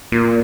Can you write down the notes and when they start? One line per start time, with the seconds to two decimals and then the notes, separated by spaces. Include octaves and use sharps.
0.12 A#2